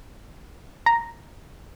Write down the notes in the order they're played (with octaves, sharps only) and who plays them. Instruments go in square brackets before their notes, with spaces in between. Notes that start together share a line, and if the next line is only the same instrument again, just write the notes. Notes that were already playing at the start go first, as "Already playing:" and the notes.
[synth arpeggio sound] A#5